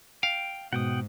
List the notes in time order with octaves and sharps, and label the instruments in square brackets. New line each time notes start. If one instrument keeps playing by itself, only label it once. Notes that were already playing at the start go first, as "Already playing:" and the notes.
[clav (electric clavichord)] F5 [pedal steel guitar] G5
[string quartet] G#2 [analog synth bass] B2 [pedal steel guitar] F#5 G5 D#6